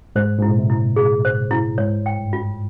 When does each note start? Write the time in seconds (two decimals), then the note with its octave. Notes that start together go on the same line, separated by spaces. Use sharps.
0.16 G#2 C5
0.39 G#2 E4
0.48 A#2
0.57 C3
0.70 E4
0.96 G#4
1.25 C5
1.51 E4
1.78 G#2 C#5
2.06 G5
2.19 G2
2.33 F4